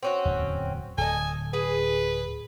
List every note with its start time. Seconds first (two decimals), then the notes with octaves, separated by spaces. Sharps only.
0.03 C4 C#4 F#4
0.25 D1 E2
0.98 D1 A4 D#5 G#5
1.53 G#4 B4